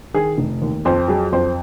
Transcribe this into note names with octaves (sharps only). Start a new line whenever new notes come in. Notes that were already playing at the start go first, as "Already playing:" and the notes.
D#3 G#4
F1
D#2
F2 C5
F#3 G#4
F2 C5